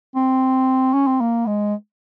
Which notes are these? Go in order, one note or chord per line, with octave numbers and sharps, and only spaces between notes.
C4
C#4
C4
A#3
G#3